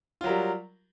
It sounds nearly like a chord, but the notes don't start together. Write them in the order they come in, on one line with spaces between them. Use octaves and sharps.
F4 F#3 A#4 G3